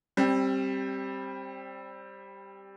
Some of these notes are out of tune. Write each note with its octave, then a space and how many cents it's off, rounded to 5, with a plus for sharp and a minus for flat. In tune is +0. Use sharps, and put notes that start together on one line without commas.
G3 +0 C4 +20